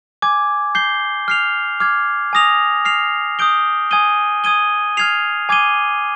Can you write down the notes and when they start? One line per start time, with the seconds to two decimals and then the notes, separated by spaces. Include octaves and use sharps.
0.22 G#5 D6 G#6
0.75 G6 C7 G7
1.28 F6 C7 F7
1.80 D6 F6 G#6
2.33 G#5 D#6 A#6 F7
2.85 F6 C7 F7
3.39 D#6 G6 D7 G7
3.91 G#5 D#6 G#6 D#7 G7
4.44 D#6 G#6 D#7 G7
4.97 F6 G#6 C7 F7
5.49 G#5 D6 G#6 D#7 G7